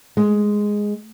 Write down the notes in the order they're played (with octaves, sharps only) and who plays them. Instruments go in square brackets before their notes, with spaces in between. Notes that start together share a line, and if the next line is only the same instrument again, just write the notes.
[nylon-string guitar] G#3